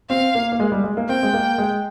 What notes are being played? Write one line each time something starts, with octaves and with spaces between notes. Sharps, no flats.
C4 F5
A#3
A#3
G#3
G3
G#3
A#3
C4 G5
G#3
A#3
G#3